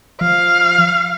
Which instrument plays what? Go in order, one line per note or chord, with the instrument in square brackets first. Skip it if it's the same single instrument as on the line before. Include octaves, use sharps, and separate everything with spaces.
[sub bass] F3 [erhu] F5